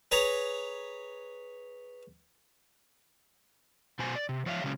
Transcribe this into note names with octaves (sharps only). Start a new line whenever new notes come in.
G#4 B4 C#5 A#5
B2 C5 G#5
D5
C3
F3 C#5 E5 F5
C#3 F#3 G#3 C#4